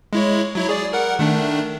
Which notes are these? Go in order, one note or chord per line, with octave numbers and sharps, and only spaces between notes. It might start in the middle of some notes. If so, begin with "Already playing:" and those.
G#3 E4 C#5
F#3 E4 C#5
G#4 D5
A#4 F#5
D#3 A3 D4